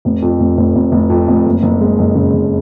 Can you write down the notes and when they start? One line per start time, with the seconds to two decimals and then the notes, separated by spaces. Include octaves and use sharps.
0.05 F1
0.22 F2
0.40 F1
0.57 F1
0.75 F1
0.92 F1
1.10 F2
1.28 F1
1.46 F#1
1.63 F#1
1.81 G#3
1.99 F#1
2.15 C#3
2.33 F#1